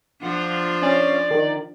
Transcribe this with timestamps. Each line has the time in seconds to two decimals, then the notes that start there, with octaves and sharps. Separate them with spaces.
0.23 F3 D4 F4 F#5
0.82 C#4 D5
1.31 D#3